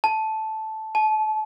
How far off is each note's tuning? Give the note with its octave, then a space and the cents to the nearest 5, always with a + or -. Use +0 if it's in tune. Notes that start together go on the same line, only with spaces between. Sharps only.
A5 -10
A5 -30